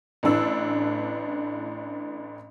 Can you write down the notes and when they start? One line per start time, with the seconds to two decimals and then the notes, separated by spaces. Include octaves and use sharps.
0.23 A1 A2 E3 D4 E6